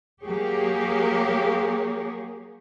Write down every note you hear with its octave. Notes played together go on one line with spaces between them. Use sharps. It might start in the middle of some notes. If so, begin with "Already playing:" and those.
F#3 A#3 G4 G#4 C#5